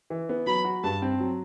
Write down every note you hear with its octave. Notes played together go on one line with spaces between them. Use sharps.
E3
B3
F#3 B5
F#4
G2 A5
C4
F#3